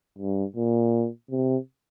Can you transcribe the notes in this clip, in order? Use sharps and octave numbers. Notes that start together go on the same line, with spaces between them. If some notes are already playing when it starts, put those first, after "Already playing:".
G2
A#2
C3